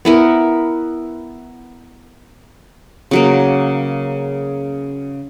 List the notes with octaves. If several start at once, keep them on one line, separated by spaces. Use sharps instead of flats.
B3 E4 A#4
C#3 F#3 A#3